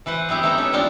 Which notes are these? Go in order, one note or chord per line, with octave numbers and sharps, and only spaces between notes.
E3 B4 C5 F#5
B3 C4 E4 G4
A3 B3 D#4 E5 A#5
C#4 A4
F3 G3 C4 D4 F4